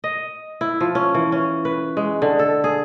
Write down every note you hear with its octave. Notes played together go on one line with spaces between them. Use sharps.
D#5
E4
F3
C#4
E3
C#4
B4
G#3
D3
A4
G#4